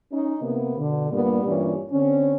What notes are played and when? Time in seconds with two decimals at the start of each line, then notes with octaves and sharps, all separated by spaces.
0.13 C#4 D#4
0.42 C3 A#3 B3
0.77 B2 D3
1.11 G2 A#2 G3 A#3 B3
1.43 G2 A#2 E3 G3 C#4
1.90 D3 C4 C#4